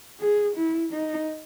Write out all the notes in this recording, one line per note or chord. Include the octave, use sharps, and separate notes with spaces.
G#4
E4
D#4